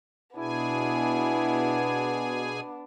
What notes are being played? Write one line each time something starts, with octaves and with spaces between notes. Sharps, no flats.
B2 B3 D4 E4 G#4 G#5